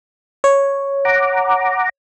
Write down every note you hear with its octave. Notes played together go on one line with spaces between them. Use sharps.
C#5
F#5 A#5 D6